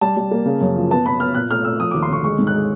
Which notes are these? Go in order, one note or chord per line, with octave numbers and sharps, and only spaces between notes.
G3 A5
G3
A#3
C#3
F#2
F3
B3 A5
B3 B5
B3 F6
A#2 F#6
A3 F6
A3 E6
F3 D#6
D#2 D6
C6
D3 C#6
G#3 C#6
G#2
F#6
G#3